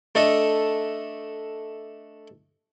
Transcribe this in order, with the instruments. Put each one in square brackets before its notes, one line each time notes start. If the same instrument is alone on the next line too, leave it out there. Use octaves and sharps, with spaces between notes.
[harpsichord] A3 D4 A4 D#5